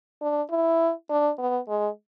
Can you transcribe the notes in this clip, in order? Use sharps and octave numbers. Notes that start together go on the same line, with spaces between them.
D4
E4
D4
B3
G#3